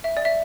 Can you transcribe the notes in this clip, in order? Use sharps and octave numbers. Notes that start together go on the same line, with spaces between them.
E5
D5
E5